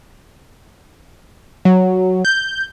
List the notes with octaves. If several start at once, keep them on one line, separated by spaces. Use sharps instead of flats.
F#3
G6